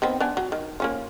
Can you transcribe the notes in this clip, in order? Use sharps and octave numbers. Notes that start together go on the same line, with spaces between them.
D#3 B3 C4
B3 D4 G#5
F#3
D#3
A#3 C#4 F4